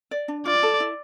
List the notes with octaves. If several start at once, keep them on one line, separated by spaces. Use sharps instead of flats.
D5
D4
F4 D5
A4
E4